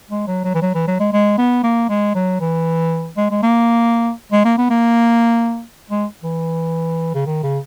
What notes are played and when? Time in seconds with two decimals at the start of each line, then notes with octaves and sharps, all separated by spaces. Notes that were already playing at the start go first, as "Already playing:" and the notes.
0.11 G#3
0.27 F#3
0.44 F#3
0.55 E3
0.62 F#3
0.74 E3
0.88 F#3
1.00 G#3
1.13 G#3
1.38 B3
1.64 A#3
1.89 G#3
2.15 F#3
2.40 E3
3.17 G#3
3.31 G#3
3.43 A#3
4.32 G#3
4.45 A#3
4.58 B3
4.70 A#3
5.90 G#3
6.24 E3
7.15 C#3
7.26 D#3
7.43 C#3